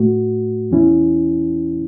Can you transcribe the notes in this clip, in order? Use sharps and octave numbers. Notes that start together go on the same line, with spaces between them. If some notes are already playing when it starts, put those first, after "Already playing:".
Already playing: A2 A3 F#4
E2 E3 C#4 E4